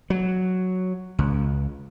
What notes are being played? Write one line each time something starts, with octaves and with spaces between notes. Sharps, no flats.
F#3
C#2